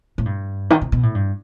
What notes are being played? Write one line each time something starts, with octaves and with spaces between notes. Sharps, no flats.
A2
G2
D#3
C3
B2
A2
G2